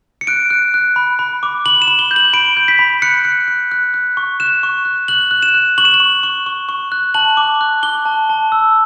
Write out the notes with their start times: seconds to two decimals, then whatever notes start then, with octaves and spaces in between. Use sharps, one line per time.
0.21 C#7
0.27 F#6 D7
0.50 F#6
0.74 F#6
0.96 B5
1.19 B5
1.43 D6
1.66 B5 F#7
1.82 E7
1.87 B5
1.99 G7
2.11 G6
2.16 F#7
2.33 B5 D7
2.57 G6
2.68 B6
2.79 B5
3.02 F#6 C#7
3.25 F#6
3.48 F#6
3.71 F#6
3.94 F#6
4.17 C#6
4.40 F#6 E7
4.63 C#6
4.85 F#6
5.08 F#6 F#7
5.31 F#6
5.42 E7
5.54 F#6
5.78 C#6 F#7
5.85 E7
5.94 F#7
6.00 C#6
6.23 C#6
6.46 C#6
6.69 C#6
6.92 F#6
7.14 A5 F#7
7.37 D6
7.61 F#6
7.83 D6 G7
8.06 A5
8.30 A5
8.52 E6